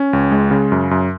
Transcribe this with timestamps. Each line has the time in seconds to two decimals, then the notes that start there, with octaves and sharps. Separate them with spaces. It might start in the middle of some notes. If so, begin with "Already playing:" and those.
Already playing: C#4
0.13 C#2
0.31 G#3
0.51 C#3
0.72 F#2
0.91 F#2